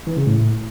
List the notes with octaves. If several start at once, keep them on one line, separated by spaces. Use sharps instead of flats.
E3
C#3
A2